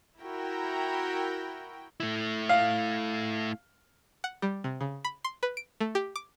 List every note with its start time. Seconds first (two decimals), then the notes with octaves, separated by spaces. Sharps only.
0.21 E4 F#4 A#4 G5
2.00 A3 E4
2.49 F5
4.24 F#5
4.42 G3
4.64 C3
4.81 C#3
5.04 B5
5.24 C6
5.43 B4
5.57 D7
5.81 A3
5.95 G4
6.16 D6